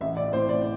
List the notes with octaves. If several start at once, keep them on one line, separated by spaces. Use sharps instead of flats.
A1 E5
D5
A2 C5
D5